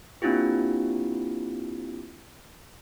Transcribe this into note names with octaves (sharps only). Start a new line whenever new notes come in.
A#3 C4 D4 E4 F4 G4